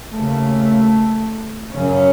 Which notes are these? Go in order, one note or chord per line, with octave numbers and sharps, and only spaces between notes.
D#2 C#3 A3
F#2 C#3 C#4